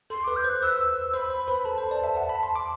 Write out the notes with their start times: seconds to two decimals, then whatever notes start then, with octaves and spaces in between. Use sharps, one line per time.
0.10 A4 C6
0.24 B4 D6
0.36 G6
0.44 C5
0.49 F#6
0.62 B4 E6
1.13 C5 C6
1.17 B5
1.30 C5
1.48 B4
1.65 A4 A5
1.78 C5
1.91 D5
2.04 E5
2.17 F#5
2.29 B5
2.43 C6
2.56 D6